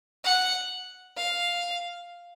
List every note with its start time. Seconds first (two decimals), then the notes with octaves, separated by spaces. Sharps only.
0.24 F#5
1.17 F5